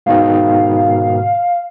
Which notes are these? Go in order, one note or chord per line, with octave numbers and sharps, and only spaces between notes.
G#2 B2 D#3 F5